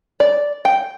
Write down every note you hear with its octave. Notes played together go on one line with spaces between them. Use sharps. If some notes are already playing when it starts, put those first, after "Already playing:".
D5
G5